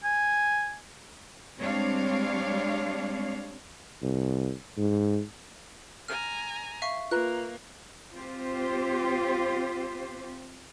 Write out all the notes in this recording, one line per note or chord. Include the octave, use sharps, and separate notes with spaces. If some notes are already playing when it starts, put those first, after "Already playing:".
G#5
G3 G#3 C4 D4 C#5 F5
C2
G#2
G#5 A#5 F6
E5 F5 C#6
A#3 F4 B4 A#5 F#6
C4 F4 G4 C5